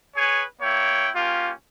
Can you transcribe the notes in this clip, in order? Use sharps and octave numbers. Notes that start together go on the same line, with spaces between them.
G#4 B4 C#5 G#5
A#3 E4 C#5 G5
A#3 C#4 F4 G4